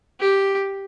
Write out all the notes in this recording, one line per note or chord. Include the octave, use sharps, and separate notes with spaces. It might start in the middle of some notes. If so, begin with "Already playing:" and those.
G4